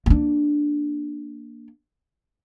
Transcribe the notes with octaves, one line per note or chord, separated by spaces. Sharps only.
A#3 D4